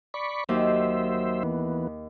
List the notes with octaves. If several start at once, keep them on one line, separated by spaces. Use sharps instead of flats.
D5 B5 C#6
D#2 F#3 C5 E5
E3 B3